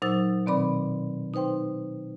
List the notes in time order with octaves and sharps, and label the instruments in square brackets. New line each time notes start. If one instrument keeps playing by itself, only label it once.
[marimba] A#2 F#3 D#4 C5 E6 A6
B2 D#3 C4 D5 B5 D6
D#4 B4 C5 G5 C6